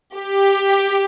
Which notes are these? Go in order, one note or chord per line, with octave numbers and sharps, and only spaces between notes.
G4